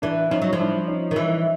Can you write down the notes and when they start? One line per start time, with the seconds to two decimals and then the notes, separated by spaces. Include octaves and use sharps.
0.02 E3 D4 E4
0.31 F3 C#4 D#4
0.42 F#3
0.53 F3
0.59 D4 E4
0.88 C#4 D#4
1.11 D#3
1.16 E3